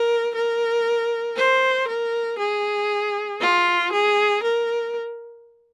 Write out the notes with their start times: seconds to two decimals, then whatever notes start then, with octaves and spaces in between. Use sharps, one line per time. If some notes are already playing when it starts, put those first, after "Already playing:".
Already playing: A#4
0.35 A#4
1.37 C5
1.88 A#4
2.39 G#4
3.41 F4
3.93 G#4
4.43 A#4